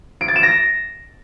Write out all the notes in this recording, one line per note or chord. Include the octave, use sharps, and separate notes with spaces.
D7
A6
E7
A#6